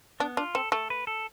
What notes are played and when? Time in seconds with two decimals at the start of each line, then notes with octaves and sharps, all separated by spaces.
0.20 B3 D4
0.37 D4 F4
0.55 C4 A4
0.72 A3 A4
0.90 B4
1.07 A4